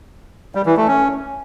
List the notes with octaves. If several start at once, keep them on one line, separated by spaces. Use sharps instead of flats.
G3
E3
A3
C#4